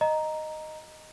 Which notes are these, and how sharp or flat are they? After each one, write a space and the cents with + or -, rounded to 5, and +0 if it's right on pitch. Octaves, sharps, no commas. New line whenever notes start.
D#5 -5 A#5 +0